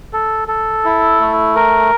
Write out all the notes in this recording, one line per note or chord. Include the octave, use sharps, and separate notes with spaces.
A4
A4
E4
A3
A#4